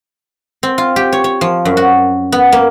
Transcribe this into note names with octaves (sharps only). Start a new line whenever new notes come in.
C4
F4
G4
C#5
C#5
F3
F#2
F#4
B3
A#3